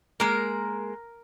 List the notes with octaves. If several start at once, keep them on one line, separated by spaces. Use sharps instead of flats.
G#3 A#3 A#4